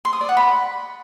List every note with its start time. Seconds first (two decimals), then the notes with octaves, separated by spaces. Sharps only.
0.05 C6
0.13 D#6
0.21 D5
0.29 F#5
0.37 B5